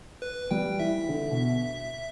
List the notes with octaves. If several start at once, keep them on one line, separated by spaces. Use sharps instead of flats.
B4
G3 G5
E3 E5
D3
B2